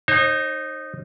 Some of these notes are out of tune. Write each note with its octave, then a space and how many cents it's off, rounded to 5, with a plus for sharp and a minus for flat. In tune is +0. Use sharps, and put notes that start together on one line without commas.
D#4 -15 C5 +40